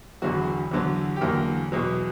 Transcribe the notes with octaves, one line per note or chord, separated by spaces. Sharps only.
E1 E2 D3 F#3 F#4
E2 D3 F#3
G4
E2 D3 F#3 A#3 A#4
E2 B2 F#3